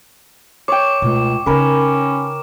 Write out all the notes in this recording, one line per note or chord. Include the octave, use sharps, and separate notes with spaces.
C#5 G5 D6
C#2 B2 A3
C#3 C#4 D#4 A#4 B4